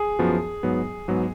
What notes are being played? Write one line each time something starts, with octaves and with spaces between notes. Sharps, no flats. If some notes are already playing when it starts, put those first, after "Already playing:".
Already playing: G#4
F#2 F3 B3 F#4
G#2 F#3 B3
G#2 F#3 B3